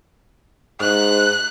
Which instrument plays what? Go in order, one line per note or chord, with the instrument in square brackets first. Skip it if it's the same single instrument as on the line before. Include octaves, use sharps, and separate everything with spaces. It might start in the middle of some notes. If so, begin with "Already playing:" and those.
[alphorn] G#2 [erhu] F#6